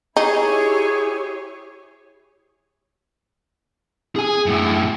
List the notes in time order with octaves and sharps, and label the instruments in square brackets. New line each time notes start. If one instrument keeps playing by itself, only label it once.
[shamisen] D#4 [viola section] E4 G4 C#5 [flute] G#4
[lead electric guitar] G#4 G#5
F#2 A2